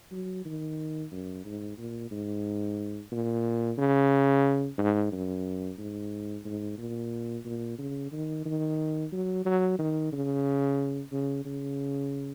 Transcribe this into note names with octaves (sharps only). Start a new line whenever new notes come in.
F#3
D#3
F#2
G#2
A#2
G#2
A#2
C#3
G#2
F#2
G#2
G#2
A#2
A#2
C#3
D#3
D#3
F#3
F#3
D#3
C#3
C#3
C#3